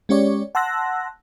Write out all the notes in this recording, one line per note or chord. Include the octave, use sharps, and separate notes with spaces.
G#3 C#4 G4 C#5 D5
F#5 A5 C6 E6 F#6 A#6